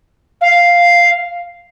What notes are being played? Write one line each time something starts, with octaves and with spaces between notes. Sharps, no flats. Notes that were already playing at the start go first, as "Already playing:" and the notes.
F5